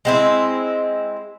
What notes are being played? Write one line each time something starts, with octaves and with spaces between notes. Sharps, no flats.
G#3 C4 E4